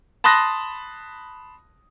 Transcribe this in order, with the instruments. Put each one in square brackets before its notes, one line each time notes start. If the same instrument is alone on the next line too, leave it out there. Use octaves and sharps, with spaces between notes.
[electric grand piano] A5 B5 C6 D#6 F#6 A#6